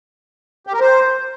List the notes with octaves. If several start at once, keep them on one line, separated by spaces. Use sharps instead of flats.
G4
A#4
C5